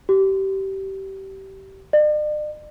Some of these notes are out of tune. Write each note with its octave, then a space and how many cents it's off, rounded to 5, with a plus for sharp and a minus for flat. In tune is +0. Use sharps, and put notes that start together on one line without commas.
G4 -25
D5 +45